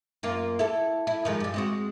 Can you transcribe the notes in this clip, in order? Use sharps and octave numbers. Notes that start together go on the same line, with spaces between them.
F#2 A#3 F4
E4 A4
E4
D#3 F3 G#3
G2 G3
G#3 C4 F#4